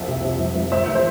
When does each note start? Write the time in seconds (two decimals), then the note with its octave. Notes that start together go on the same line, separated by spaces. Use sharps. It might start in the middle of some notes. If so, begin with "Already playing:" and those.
Already playing: C2 F2 F3 E5
0.08 C3
0.24 C3
0.40 F3
0.56 F3
0.72 A1 C5 E5
0.87 E3
0.95 C5 E5